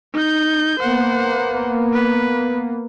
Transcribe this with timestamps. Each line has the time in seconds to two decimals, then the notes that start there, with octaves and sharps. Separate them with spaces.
0.14 D#4 G6
0.80 A#3 B3 C5 F#5
1.93 B4